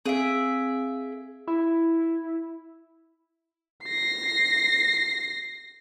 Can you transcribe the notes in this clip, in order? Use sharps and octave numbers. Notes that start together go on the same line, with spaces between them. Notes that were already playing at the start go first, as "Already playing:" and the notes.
C4 G#4 E5 F5 D7
E4
A#6 C7